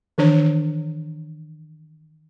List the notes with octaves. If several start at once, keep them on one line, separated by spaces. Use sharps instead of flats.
D#3 E3 D4 C#5